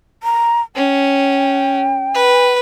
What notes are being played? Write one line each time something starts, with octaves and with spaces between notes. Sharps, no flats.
A#5
C#4 G5
B4